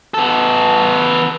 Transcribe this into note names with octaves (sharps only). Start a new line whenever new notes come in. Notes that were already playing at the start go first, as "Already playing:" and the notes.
B3 A4